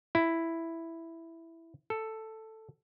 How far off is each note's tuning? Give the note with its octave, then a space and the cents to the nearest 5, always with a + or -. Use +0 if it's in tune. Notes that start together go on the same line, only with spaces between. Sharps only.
E4 +0
A4 +5